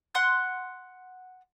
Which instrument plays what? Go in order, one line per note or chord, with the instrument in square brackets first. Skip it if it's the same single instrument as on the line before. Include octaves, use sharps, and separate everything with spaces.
[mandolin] F#5 C6 F#6